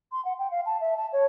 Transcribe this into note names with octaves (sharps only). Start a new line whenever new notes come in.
C6
F#5
G5
F5
A5
E5
A5
C#5